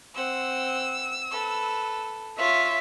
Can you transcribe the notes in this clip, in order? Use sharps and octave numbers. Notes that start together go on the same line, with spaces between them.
C4 F#5 E6
A4 B4
F4 C#5 E5